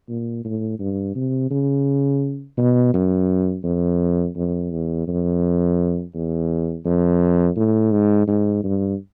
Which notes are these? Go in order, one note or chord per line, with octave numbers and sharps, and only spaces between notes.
A#2
A2
G2
C3
C#3
B2
F#2
F2
F2
E2
F2
E2
F2
A2
G#2
G#2
G2